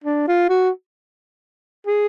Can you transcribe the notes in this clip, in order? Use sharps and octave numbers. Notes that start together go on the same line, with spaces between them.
D4
F4
F#4
G#4